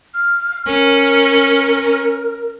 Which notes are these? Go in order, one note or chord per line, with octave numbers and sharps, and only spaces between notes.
F6
C#4 A#4